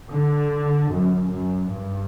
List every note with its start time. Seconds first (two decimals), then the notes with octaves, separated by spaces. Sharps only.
0.14 D3
0.92 F#2
1.32 F#2
1.72 G2